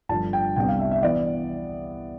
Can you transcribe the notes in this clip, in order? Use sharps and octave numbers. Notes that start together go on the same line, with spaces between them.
G1 G2 F3 A3 D4 A5
G5
C2 C3 G3 B3 D4 G5
F5
E5
E5
E3 B3 D5